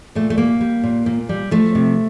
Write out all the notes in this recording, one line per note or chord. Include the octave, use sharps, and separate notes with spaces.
A#2 A3
A3
G3 A#3
G3
A#2
A#2
G3
F3 A3
C3